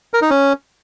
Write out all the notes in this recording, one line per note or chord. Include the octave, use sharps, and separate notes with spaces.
A#4
D#4
C#4